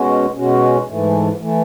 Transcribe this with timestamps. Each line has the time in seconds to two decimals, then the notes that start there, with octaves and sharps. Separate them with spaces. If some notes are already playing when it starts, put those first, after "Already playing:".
Already playing: B2 G#3 C#4 F#4
0.36 B2 G#3 C#4 F#4
0.88 G#2 E3 A3
1.41 E3 A3